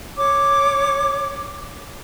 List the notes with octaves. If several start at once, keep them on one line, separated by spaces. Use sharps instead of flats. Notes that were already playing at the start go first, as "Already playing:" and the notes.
C#5 D6